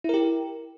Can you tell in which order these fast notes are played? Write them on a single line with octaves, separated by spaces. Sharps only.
E4 A#4 G4